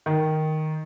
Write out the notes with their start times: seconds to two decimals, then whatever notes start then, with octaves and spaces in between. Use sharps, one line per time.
0.06 D#3